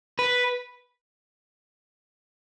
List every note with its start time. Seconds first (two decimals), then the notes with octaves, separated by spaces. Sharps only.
0.19 B4